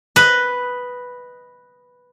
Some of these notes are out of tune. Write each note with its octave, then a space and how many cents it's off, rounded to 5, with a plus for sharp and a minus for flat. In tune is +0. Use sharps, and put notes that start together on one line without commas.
B4 +0 D#5 +0